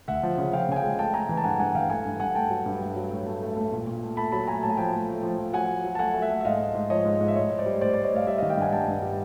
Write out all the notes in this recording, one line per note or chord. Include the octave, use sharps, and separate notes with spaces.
D2 E5 F#5
F3
C#3
F3 F5 G5
C#3 G#5
F5 G5
G#3
A3 G5 A5
A3 G#5 A#5
E3
A5
G2 F#5 G#5
G2 F#5 G#5
E3 F5 G5
A3 F#5 G#5
G2
G2 F#5 G#5
A3 G5 A5
F#3
G2
A3
F#3
A2
A3
A3
A3
A#2
A#2
A3
A3 A5 B5
F#3 A5 B5
A3 G#5 A#5
A2 A5
G#5
F3 G5 A5
A3
A3
F3
F3
F#3 F#5 G#5
F#3
F#3
A5
A3 F#5 G#5
A3
E5 F#5
A3
E5
G#2 D#5 F5
G#2
G#2
F3 C#5 D#5
G#2
G#2
E5
A2 C#5 D#5
A2
C5 D5
G3
A2 C5 D5
A2 D5
C#5 D#5
A2 F5
G3 D5 E5
D#3 D#5 F5
F5 G5
G2 F#5 G#5
G2 G5 A5
G2
G3